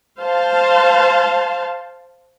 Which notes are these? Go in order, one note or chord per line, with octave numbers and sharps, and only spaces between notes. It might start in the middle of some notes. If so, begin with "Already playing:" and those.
C5 F5 A5